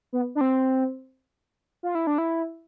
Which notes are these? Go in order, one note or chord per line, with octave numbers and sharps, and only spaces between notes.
B3
D4
C4
F4
E4
D4
E4